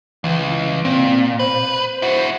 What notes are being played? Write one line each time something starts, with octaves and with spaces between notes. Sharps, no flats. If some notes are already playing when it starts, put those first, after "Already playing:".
C#2 E3
A#2 C4
B4 C5
E4 F#4